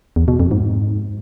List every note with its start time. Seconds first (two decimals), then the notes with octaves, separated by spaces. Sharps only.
0.16 E2
0.28 B2
0.40 F2
0.51 G#2